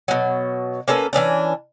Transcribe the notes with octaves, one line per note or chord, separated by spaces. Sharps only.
B2 F#3
A#3 C#4 A4 B4
E3 B3 C#4 D4